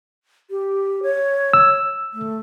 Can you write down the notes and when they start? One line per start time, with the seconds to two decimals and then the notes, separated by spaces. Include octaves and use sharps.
0.51 G4
1.03 C#5
1.54 E6
2.13 A3